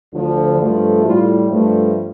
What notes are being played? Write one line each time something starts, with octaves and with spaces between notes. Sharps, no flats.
D2 D3 F3
G2 F3 A3
A2 G3 F4
G2 F3 A3